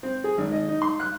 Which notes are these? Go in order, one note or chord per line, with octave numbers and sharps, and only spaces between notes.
C4
G#4
G#1
D#5
D#4
C6
F#6